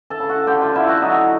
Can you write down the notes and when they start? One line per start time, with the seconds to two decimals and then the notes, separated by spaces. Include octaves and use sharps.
0.10 A4 A5
0.19 C#3
0.29 F#4 F#5
0.47 D3 G4 G5
0.61 F4 F5
0.74 D3 E4 E5
0.88 F#4 F#5
1.02 F#3 D#4 D#5